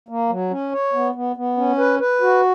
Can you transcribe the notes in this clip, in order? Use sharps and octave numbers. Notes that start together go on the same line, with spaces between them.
A#3
F#3
C#4
C#5
B3
B3
B3
C#4
B4
B4
F#4